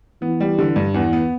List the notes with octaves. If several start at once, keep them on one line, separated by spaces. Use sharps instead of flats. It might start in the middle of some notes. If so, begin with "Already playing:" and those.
E3 B3
G3
D3
G2
E2 E3
B3